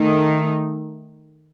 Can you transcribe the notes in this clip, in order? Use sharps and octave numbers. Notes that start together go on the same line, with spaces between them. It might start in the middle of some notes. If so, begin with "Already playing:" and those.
Already playing: D#3 A3 D#4